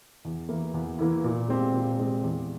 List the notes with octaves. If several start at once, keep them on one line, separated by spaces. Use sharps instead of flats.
E2
E3 A#3 E4
E2
E3 A#3 E4
A#2
G#3 C4 G4
A#2
G#3 C4 G4
E2